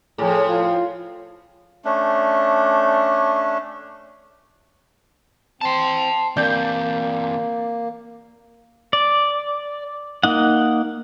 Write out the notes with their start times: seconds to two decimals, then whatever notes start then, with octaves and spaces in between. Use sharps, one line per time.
0.18 A2 F3 G#4
0.49 F4
1.85 A3 C#4 D4
5.61 C4 A5 C6
6.37 E3 A#3 C4 D5 G6
8.93 D5
10.23 A#3 D#4 F#5